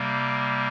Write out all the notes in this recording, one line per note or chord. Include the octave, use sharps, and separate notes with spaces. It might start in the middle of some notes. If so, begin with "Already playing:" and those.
Already playing: C3 G3 A#3